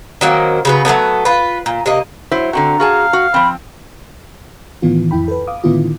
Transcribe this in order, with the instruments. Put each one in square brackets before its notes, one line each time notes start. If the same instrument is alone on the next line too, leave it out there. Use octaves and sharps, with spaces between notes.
[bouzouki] D#3 F#3 A#3 C4
C#3 F#3 B3
F#3 G#3 A3 B3
F4 B4
A#2
C3 A#3 D#4
[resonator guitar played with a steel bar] F#3 E4 C5
[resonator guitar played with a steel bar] D3 C4 F#4 [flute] A#5
[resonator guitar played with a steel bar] F#4 G#4 A5 [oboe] F5
[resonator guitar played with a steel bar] F#4
[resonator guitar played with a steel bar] F3 C4 [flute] B5
[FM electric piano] A2 D#3 E3 B3 F4
F2 E4 G5 B5
A4 B4
F5 D6 D#6
A2 D3 D#3 B3 E4 F4